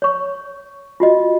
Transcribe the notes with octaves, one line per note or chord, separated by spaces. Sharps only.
C#5 C#6
F4 F#4 D#5